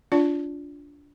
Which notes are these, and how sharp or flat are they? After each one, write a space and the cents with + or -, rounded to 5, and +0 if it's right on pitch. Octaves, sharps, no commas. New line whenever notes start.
D4 -20 F4 +0 D5 -20